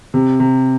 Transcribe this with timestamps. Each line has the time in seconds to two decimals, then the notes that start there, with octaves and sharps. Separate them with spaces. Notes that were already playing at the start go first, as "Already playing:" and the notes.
0.14 C3
0.40 C3